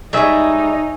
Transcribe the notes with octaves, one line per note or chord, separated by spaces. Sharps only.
G3 G#3 D#4 G#4 C#5 E5